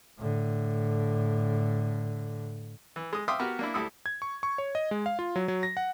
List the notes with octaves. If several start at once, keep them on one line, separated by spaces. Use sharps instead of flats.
A2 D3
E3
G#3 D#6
E5 F5 G5 C6 D6 D#6
B3 F#4 G4 A#4 B4
A#3 D4 E4
D2 G3 E4 A4 D#6
G#6
C#6
C#6
C#5
D#5
G#3
F5
F4
F#3
F#3
A#6
F#5